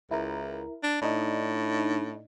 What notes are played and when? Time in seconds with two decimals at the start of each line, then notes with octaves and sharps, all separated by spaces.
0.11 C#2 E4 A#4
0.83 D4
1.02 A2 D4 D#4